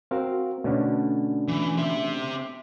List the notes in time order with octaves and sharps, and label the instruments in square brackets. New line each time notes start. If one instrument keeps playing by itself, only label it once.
[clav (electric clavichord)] C4 [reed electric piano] F#4 A#4 F5
[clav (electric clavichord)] B2 D3 B3 [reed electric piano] A3 C#4 D4
[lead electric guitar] E3
C4 E5